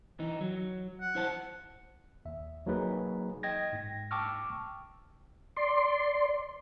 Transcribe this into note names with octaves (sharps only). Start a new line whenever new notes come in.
E3 D#4
F#3
F#5
E4 C5 A5
D#2 E5
F#3 A#3 D#4 G#4 B4
D#5 G5 G#6 A#6
G#2 A#6
G5 A5 C#6 D6 E6 F6
D5 C6